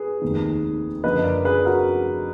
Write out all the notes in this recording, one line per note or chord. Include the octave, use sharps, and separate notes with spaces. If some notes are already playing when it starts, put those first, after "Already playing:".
Already playing: G#4 B4
F1 D#2 D#3
F#1 F2 D3 B4 D#5
A#4 D5
G#4 B4
F#4 A#4